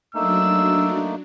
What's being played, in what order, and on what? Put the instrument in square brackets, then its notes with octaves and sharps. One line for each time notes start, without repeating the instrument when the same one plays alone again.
[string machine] F#3 D4 [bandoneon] A3 A#3 D#4 [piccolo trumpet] E6